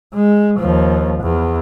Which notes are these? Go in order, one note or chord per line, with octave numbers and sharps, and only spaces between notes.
G#3
D#2 F3
E2